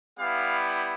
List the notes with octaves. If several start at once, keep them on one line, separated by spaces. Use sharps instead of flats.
G3 B3 E4 G4 F5